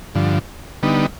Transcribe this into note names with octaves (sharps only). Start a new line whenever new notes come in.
G2 D3 F3
D3 G3 B3 D#4